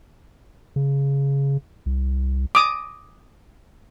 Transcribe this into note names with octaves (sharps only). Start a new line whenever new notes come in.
C#3
C2
D6 D#6